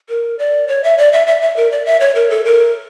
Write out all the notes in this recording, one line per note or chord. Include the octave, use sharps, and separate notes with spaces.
A#4
D5
C#5
E5
D5
E5
E5
E5
A#4
D5
E5
C#5
A#4
A4
A#4